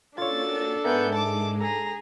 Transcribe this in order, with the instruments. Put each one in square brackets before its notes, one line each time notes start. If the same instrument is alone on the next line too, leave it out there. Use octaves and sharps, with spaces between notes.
[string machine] A#3 C#4 F#4 [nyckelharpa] D4 A4 [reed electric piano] F4 C#5 [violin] A6
[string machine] G#2 G#3 [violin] B3 G6 [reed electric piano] A#4 E5 G#5
[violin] A5 D6
[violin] G#4 [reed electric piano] A4 [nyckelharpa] A#5